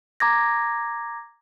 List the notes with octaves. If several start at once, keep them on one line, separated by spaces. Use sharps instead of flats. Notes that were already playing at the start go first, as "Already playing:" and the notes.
A#5 D6 G#6 A#6